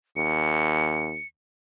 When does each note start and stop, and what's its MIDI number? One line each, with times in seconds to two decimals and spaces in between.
0.16 1.16 39
0.16 1.27 97